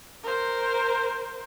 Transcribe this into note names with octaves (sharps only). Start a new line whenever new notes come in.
A#4 C5